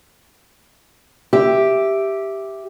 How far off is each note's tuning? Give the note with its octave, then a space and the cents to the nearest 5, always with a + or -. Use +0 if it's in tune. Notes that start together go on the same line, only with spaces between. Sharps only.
G4 +0 E5 +0